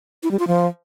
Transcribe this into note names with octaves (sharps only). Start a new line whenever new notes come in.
E4
G3
F4
F3